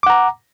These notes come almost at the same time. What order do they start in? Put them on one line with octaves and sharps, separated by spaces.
D6 F#5 A#5